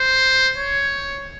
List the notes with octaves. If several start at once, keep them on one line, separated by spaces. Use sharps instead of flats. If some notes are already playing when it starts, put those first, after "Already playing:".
Already playing: C5
C#5